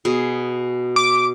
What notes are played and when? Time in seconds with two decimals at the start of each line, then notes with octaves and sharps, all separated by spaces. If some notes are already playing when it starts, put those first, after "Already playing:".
0.05 B2 G#4
0.96 D6